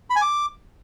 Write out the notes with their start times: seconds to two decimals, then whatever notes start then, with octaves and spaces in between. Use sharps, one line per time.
0.10 B5
0.16 G#5
0.22 D6